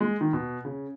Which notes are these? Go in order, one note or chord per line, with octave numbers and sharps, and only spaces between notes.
G#3
D#3
B2
C#3